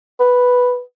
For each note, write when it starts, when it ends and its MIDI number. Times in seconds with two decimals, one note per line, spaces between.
0.20 0.80 71